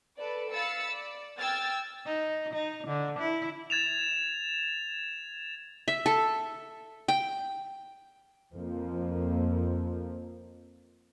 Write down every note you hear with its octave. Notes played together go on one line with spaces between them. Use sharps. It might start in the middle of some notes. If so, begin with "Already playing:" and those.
A4 B4 D5
F5 B5 E6 A6 C#7
D5
G5 E6 F6 G#6 A6
D#4
D#4
D3
E4
G#6 A6 E7 F7
E5
A4
G5
F2 F3 A#3